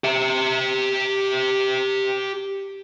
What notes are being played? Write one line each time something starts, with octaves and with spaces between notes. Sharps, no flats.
G4 E5